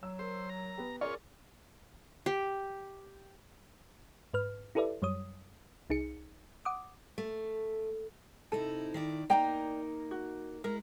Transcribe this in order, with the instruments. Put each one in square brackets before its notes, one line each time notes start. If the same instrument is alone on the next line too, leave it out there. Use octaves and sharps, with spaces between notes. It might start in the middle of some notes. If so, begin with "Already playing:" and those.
[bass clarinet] F#3 [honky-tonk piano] E6
[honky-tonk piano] A#4 [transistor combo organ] C5
[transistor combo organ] A#5
[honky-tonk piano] B3 G4
[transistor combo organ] C#4 F4 C#5 [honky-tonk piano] G#4 A#4 D5
[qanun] G4
[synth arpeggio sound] G#2 B4 F6
E4 G4 A4 B4 D5 E5
F#2 F#3 G3 C#5 D#6
C2 D#4 G#4 C#7
F#5 D6 D#6
[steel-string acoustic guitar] A3
[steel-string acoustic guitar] C3 D#4 E4 [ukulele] A4
[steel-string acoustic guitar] D#3 E4 D5
[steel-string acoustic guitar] A#3 D#4 A#4 [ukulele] D5 G5 A#5
[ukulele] F#4
[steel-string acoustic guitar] G#3 E4 [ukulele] A#4